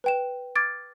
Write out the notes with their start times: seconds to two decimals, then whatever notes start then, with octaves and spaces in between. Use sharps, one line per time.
0.04 B4 G5 E7
0.55 D6 F6 G#6 A6 D7